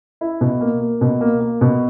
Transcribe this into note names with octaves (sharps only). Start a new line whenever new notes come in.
E4
B2
A#3
A#3
B2
A#3
A#3
B2